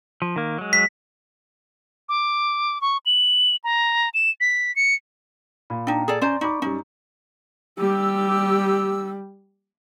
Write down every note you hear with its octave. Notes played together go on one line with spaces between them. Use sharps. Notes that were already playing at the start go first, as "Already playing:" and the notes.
F3
D#3 A#3
F#3 G#3
B6
D6
C#6
F#7
A#5
E7
B6
C#7
A#2 B5
D4 D#4 F4 G5 A#5
G#4 A4 D5
C#4 C5 D5 A#5 C6
D#4 D5 B5 C#6 D6
F#2 G3 D#4
G3 G4 E6